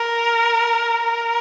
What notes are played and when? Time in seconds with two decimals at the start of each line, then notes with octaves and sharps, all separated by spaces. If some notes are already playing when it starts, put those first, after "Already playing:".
Already playing: A#4
1.03 A#4